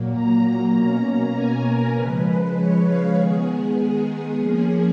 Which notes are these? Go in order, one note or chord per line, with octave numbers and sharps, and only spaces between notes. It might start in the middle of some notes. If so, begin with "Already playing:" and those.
Already playing: A#2 F#3 A#3
A#5
A#5
B2 A#3 C#4
G#5
A#4
C#3 F3 G#3 B4
C#5
F5
D#3 G#3 B3 G#4
F3 A#3 C#4 G#4